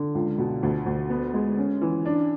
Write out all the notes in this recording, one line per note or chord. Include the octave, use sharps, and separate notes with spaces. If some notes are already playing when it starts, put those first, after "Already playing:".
Already playing: D3
C#2
B2
D2
D2
B3
G#3
C#4
E3
D4